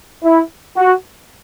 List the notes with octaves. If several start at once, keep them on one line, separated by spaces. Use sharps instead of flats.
E4
F#4